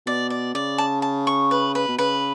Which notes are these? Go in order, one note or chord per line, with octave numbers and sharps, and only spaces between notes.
B2 D5
D5
C#3 D5
A5
A5
C#6
B4
B4
B2
C#3 B4